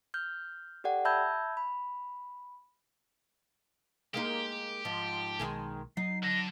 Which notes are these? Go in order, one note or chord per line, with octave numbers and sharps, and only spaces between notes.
F6 G6
G4 A4 D5 F#5 G5
E5 A5 B5 E6 G6 G#6
B5
G#3 A#3 D#4 G4
G#2 F3 A5
B1 D#3 G#3 G#4
F#3 D#4 C7
D3 D4 A#6